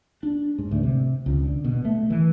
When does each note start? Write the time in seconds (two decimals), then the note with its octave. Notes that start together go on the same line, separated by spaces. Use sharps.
0.23 D4
0.58 G#2
0.71 D2
0.83 C3
1.26 C#2
1.44 D3
1.64 B2
1.85 A3
2.10 E3